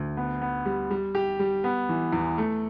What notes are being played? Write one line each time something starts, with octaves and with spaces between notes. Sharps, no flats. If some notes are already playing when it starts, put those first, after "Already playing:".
Already playing: D2
B3
B3
G3
G3
G4
G3
B3
E3
E2
A3